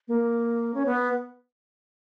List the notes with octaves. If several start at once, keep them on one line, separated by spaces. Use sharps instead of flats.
A#3
C#4
B3